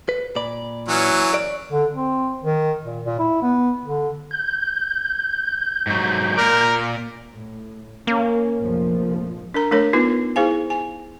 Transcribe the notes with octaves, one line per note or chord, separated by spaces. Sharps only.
B4
A#2 D5 B5
E3 F#3 C#4
D5
D3
C4
D#3
A#2
A#2
E4
B3
D3
G6
G#2 F#3
A#2 A#4 D5
A2
A#3 C#4
F1 A#1 F3
D4 A#4 A#5
A3 D4 A#4 C#5
B3 D#4 F4 B4
E4 G#4 C5 F5 G#5
G#5